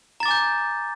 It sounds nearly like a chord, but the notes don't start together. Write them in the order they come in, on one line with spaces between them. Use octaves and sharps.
A#5 A6 D6 G#5 G6